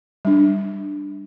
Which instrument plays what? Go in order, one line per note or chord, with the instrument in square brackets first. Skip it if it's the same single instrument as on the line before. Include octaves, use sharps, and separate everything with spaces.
[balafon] G3 D4